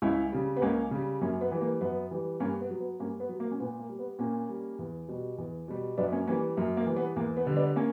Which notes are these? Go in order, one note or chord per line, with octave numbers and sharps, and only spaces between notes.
C#2 C#4 E4
C#3 G3
B3
C#2 A#3 C#4
C#3 G3
F#2 A#3 C#4
B3
E3 G3
A#3
F#2 B3
E3 G3
G2 A#3 C#4
B3
F#3
B3
G2 A#3 C#4
B3
F#3
A#3
C#4
A#2 B3
A#3
G3
B3
A#2 A#3 C#4
G3
E2
B2 G3
E2
B2 G3
F#2 B3 D4
A#3 C#4
E3 G3 A#3 C#4
F#2 A#3
A#3
E3 G3
B3
E2 A#3
B3
D3 G3
B3 D4
A#3 C#4